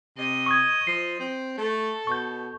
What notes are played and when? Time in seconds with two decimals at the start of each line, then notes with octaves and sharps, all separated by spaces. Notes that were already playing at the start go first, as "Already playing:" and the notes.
0.17 C3 D#5
0.46 C#6 D#6 G#6
0.87 F3 C7
1.20 C4
1.57 A3 A4
2.07 B2 C#6 G6